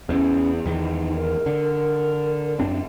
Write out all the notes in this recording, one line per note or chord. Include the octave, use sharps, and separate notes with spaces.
E2 C#4
E2 D#3 D#4
A#4
D3
F#2 C4 D4